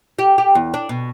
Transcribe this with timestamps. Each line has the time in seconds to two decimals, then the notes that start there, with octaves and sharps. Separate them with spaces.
0.19 G4
0.38 G4
0.55 E2
0.74 D4
0.89 B2